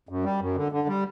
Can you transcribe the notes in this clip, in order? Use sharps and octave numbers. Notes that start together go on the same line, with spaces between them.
F#2
G3
F#2
D3
D3
G3